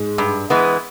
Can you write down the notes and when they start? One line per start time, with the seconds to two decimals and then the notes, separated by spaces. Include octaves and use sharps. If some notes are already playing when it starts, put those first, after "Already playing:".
Already playing: G#2 G#3
0.18 G2
0.50 E3 G#3 B3